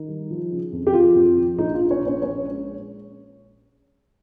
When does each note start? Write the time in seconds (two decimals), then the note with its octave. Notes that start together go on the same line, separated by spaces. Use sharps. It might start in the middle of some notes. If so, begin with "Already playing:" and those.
Already playing: D#3 D#4
0.08 G3
0.31 F3
0.51 C#3
0.73 F2
0.87 G4
0.94 F3 F4
1.15 F2
1.37 F3
1.58 A#1 D#4
1.74 F4
1.80 A#1
1.91 C#4 C#5
2.01 A#2
2.07 C#4 C#5
2.22 A#1 C#4 C#5
2.43 G#3